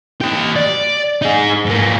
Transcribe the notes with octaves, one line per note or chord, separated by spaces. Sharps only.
G4 D#5
D5
D#4 G#4
G#2 A#3